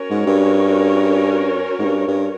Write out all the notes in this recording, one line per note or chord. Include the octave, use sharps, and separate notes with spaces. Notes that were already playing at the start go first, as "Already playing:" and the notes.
Already playing: C#4 F#4 A#4 C#5
G#2
G2
G#2
G2
G2